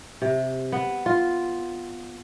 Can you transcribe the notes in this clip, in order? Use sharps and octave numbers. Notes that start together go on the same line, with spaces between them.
C3
B3
F4